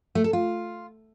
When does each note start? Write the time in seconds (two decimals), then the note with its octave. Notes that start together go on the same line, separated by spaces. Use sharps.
0.15 A3
0.24 A4
0.33 F4